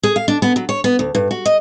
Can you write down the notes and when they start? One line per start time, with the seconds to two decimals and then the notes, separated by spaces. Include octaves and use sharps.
0.03 G#4
0.16 F5
0.28 D4
0.42 B3
0.56 F#3
0.69 C#5
0.84 B3
0.99 D2
1.15 G2
1.31 F#4
1.46 D#5